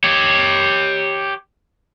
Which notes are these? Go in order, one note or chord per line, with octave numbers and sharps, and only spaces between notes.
G4 C#5